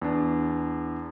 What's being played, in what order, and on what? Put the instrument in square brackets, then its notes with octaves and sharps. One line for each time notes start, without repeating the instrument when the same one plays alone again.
[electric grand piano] E2 D4